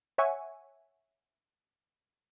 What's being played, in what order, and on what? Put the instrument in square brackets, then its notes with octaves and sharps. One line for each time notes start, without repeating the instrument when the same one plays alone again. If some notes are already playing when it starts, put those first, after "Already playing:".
[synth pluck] C#5 E5 F#5 G#5 C#6